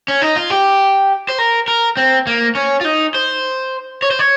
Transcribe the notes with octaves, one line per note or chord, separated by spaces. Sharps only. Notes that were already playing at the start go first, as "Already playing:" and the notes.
C#4
D#4
F4
G4
C5
A#4
A#4
C4
A#3
C#4
F4
D#4
C5
C#5
C5
C#5